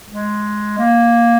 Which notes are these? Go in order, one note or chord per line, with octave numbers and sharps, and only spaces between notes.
G#3
A#3